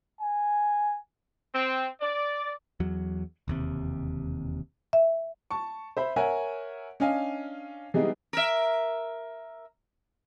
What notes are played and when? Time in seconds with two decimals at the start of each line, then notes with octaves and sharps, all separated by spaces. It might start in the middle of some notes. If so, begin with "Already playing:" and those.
0.21 G#5
1.54 C4
2.01 D5
2.80 E2 F#3
3.48 E1 D#2 C3
4.93 E5
5.51 A5 C#6
5.97 C5 E5 B5
6.16 A#4 C#5 E5 F#5 G#5
7.00 C#4 D4 D#5 F5 G#5
7.94 E3 G3 G#3 B3 D#4 G#4
8.33 A#4 E5